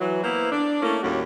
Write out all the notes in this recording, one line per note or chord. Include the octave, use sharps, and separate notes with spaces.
E3 F#3
A#3 B3 E4 C5
D4
A3 A#3 C#4 E4
D#2 A2 G3 C#4 F#4